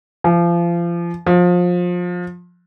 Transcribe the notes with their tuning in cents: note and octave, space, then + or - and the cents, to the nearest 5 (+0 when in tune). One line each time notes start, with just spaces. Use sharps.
F3 -30
F3 +25